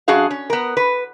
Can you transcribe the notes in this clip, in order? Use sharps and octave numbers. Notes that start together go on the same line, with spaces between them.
F#2 D4 F#4 G#4 F5
C#4
B3 A#4
B4